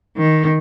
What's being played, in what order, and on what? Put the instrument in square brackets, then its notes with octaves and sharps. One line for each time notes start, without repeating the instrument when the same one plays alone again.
[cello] D#3